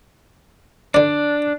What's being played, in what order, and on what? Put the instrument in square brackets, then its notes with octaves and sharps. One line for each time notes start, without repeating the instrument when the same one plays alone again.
[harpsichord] D3 D5 [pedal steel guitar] D4